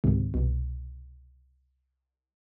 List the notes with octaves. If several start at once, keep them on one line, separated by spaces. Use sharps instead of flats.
C#2 G#2 C3 D#3
C2 B2